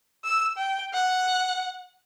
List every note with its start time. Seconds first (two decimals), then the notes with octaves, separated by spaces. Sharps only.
0.24 E6
0.57 G5
0.94 F#5